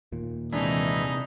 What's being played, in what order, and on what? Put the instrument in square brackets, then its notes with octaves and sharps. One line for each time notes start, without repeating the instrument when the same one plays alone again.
[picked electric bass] D#2 A#2
[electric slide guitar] C3 D4 [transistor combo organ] E3 G#3 B5 [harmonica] D#4